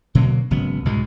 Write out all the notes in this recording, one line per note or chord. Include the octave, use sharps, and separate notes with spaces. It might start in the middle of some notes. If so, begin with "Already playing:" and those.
B2 D3 F#3 A#3
G#1 C#3 F#3 B3
C2 G#2 B2 G#3